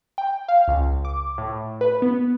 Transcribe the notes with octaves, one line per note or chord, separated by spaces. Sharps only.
G5
F5
C#2
D6
A2
B4
B3